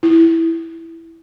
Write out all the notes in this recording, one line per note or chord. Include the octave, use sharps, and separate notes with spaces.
E4